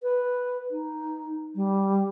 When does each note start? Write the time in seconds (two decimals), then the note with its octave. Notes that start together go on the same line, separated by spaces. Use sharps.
0.03 B4
0.71 D#4
1.55 G3